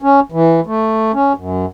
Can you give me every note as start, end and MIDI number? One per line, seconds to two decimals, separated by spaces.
0.02 0.20 61
0.32 0.60 52
0.67 1.12 57
1.14 1.33 61
1.37 1.65 42